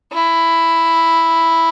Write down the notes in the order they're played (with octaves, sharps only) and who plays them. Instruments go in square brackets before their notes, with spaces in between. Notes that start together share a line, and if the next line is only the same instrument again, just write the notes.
[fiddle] E4